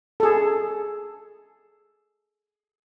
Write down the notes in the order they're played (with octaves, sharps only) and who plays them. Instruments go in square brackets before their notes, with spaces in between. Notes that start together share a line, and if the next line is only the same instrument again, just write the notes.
[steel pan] G#4 A4